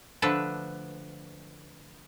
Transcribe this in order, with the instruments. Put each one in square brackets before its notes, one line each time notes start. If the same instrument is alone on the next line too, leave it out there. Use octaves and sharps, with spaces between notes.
[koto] D3 F3 A3 D4 A4 B4